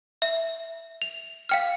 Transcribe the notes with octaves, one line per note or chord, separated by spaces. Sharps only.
E5
F7
F5 G5 F6